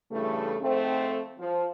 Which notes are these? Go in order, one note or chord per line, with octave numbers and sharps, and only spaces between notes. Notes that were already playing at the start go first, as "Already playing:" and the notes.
G2 C#3 E3 A3
F2 G#2 A3 C4
F3